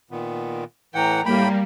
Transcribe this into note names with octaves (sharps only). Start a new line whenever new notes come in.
A#2 D#3 B3
A2 E3 F#5 G5 A#5
A2 G3 A#3 G4 G5 B5